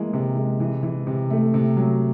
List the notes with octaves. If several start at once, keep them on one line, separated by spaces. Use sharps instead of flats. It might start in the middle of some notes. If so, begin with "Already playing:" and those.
Already playing: E3 G#3 A#3
C3
G#3
E3
E3
C3
A3
C3
F#3